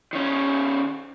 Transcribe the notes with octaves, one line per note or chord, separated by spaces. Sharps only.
D#3 C#4